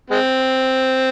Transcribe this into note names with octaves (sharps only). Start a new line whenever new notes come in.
G#3 C4